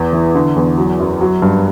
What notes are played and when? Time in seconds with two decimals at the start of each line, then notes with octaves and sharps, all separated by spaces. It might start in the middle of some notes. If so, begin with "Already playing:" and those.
Already playing: E2 B3
0.13 E3
0.35 D3
0.56 E2
0.78 F#3
0.99 F#2
1.21 F#3
1.42 G2